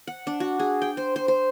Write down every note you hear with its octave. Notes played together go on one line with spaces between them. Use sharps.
F#5
D4
F#4
G#4
G5
C5
C5
C5